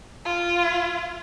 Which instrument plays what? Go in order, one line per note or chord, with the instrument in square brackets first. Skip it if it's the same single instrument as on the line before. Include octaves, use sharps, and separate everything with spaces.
[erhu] F4